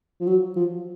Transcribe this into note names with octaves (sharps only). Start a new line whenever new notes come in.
F3
F#3
F3